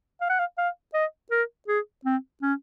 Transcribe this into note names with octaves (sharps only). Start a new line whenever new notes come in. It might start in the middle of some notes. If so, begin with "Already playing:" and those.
F5
F#5
F5
F5
D#5
A#4
G#4
C4
C#4